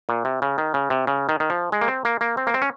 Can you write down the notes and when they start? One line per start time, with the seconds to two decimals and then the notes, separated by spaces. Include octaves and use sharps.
0.09 A#2
0.25 C3
0.42 C#3
0.58 D#3
0.74 C#3
0.90 C3
1.07 C#3
1.29 D#3
1.40 D#3
1.50 F3
1.72 G#3
1.81 A#3
1.88 C4
2.05 A#3
2.21 A#3
2.37 C4
2.47 A#3
2.54 C4
2.62 C#4